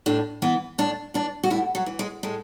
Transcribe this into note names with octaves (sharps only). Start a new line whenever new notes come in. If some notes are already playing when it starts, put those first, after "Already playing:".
A2 D4
E3 B3
A2 D4
E3 D4
F#4
A2 E4
F#3
E3
G#3
A2 G#3